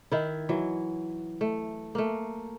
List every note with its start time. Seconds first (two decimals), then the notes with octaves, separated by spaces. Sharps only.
0.12 D#3 E4
0.49 E3 F#3
1.41 A3
1.95 A3 A#3